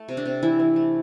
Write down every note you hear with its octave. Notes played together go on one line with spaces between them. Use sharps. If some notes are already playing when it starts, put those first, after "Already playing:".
Already playing: A3
C3
D4
C3
E3 E4
E3
A3